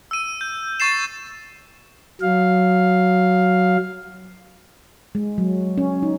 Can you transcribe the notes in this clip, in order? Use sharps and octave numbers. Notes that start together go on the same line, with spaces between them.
E6 D#7
G6
C#6 A6 C7 E7
F#3 F5
G#3
F#3
C#4
D#4